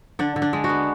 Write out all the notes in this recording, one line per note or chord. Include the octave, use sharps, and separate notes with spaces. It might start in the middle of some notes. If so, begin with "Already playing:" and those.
D3 D4
D3
D4
G#3
F#4
B3